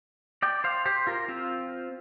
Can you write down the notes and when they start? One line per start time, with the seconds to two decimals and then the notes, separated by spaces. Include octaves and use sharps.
0.42 D5 G5
0.64 C5 F5
0.85 G4 C5
1.07 F4 A#4
1.28 C4 F4